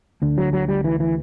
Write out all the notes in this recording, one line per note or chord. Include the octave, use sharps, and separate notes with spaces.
D2 D3
F#3
F#3
G3
E3
E3